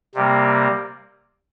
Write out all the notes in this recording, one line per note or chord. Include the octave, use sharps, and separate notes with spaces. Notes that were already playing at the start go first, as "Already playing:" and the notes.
C3 G3 A#3